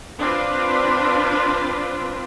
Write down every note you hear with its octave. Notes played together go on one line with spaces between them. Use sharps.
C4 D4 F4 B4